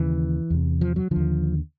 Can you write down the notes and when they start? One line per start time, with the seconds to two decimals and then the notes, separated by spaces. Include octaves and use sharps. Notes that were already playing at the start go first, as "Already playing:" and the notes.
Already playing: D#2 C#3 E3
0.50 E2 C3
0.81 F3
0.96 F#3
1.11 D#2 D3 F3